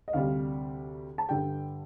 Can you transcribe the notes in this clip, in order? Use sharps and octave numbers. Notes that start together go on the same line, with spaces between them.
D#5
D2 C3 G3 F5
A5
G2 D3 G3 G5